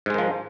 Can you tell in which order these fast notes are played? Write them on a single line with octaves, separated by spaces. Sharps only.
G#2 G#3 D#3 F3